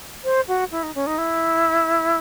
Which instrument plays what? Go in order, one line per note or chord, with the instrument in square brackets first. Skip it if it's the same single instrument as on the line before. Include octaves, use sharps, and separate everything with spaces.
[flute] C5
F#4
E4
D#4
C#4
D#4
E4